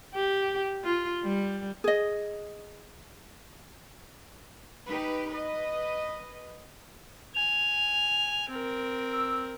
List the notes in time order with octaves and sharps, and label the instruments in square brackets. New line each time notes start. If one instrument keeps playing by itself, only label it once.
[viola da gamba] G4
F4
G3
[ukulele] G#4 D#5
[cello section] D#4 G4 B4
B4 D#5
[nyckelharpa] G#5 [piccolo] F7
[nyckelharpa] C4 A#4
[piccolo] E6